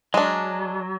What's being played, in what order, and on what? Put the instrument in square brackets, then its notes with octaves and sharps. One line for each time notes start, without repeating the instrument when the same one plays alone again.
[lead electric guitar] F#3 [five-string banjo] G#3 D4